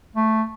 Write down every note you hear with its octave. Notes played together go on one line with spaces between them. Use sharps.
A3